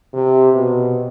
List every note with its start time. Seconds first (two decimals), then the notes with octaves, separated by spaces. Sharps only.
0.14 C3
0.53 B2